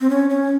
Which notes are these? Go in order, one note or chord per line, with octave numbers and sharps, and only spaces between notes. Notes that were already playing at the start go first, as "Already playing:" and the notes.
C4
C#4
C#4